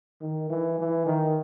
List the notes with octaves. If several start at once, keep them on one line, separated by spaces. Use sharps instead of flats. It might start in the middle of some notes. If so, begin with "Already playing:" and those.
D#3
E3
E3
D#3